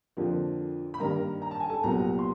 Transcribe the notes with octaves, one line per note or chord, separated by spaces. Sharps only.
F2 D3 F3 A#3
B5
G2 D#3 G3 A#3 A#4 A#5
A#5
A5
G#5
A4 A5
C2 A#2 F#3 B3 A#4 A#5
C6